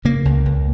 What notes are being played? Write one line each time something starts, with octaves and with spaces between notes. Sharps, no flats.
C#3 A#3
C#2
C#2